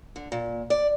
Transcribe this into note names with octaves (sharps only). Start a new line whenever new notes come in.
D3
A#2
D5